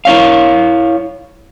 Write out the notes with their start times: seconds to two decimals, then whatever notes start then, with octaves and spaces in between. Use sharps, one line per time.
0.05 E4 C#5 F5